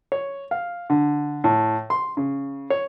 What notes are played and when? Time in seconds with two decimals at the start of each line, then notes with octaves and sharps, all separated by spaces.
0.12 C#5
0.51 F5
0.90 D3
1.44 A2
1.90 C6
2.17 C#3
2.70 C#5